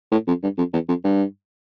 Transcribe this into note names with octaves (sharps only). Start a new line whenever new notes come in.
A2
F2
G2
F2
E2
F2
G2